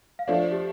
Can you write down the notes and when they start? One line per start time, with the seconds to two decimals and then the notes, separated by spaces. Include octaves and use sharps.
0.19 F5
0.28 F3 A3 D4 D5
0.40 C5
0.52 G4